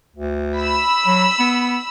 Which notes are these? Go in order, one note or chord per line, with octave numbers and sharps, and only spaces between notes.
D2
B5 E6
F#3
B3